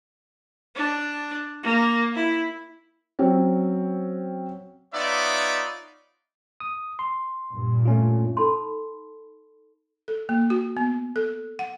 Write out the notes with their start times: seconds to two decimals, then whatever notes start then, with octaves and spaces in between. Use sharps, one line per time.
0.75 D4
1.63 A#3
2.15 E4
3.19 F#3 C4 C#4
4.94 B3 D#4 F4 C#5 D5 E5
6.60 D#6
6.99 C6
7.51 G2 A#2
7.85 A3 C#4 F4
8.37 D#4 A4 A5 B5 C6
10.08 A4
10.29 A#3
10.50 F#4
10.77 B3
11.16 A4
11.59 F#5